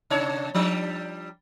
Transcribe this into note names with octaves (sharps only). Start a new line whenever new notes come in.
C3 D4 C#5
F3 G3 D4